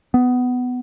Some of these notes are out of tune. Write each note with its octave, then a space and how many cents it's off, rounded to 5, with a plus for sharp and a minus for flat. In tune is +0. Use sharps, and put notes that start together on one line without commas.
B3 +15